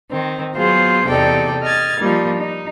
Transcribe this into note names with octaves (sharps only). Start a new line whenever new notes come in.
D#3 C4
F#3 B3 F4 G#4 C5
E2 C3 D#4 A4 D5 G5
D#5 F6 G#6 A6
F3 G3 A#3 D#4
D#4